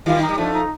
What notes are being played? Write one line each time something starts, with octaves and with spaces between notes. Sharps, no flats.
D#3 G3 F4
D#4
G3
F3 A3 D4
D#4